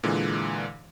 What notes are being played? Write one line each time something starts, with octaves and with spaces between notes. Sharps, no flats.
A#2 D3 E3 G#3